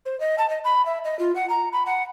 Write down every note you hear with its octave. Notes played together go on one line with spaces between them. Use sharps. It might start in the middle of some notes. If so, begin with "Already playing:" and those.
C5
D#5
A5
D#5
B5
E5
D#5
F4
F#5
A#5
B5
F#5